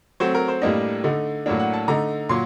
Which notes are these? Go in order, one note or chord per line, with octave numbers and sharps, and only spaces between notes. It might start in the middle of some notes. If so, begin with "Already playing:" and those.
F#3 A3 C4 C5
A#4
C5
A2 G3 A#3 D4 D#5
D3 A3 D#4
A2 F#3 A#3 D4
F#5
A5
D3 A3 D#4 A#5
A#2 F#3 C6